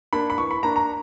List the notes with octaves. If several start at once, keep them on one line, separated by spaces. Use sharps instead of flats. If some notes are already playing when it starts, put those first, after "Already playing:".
A#3 D4 B5
B5
E3 C#6
B5
A#3 D4 A#5
A#5